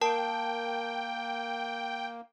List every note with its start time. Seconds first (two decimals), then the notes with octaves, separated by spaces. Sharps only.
0.01 A#3 A#4 G5 A5